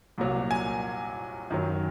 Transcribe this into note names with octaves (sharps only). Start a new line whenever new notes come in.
C2 A#2 F#3
G#5
F#2 D#3 F#3